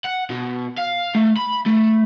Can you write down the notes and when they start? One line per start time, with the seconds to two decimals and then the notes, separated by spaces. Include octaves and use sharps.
0.05 F#5
0.30 B2
0.77 F5
1.15 A3
1.37 B5
1.66 A3